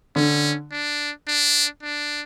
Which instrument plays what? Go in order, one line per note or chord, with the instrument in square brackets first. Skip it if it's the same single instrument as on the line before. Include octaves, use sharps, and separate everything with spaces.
[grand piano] D3 [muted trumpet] C#4
[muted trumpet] D4
D4
D4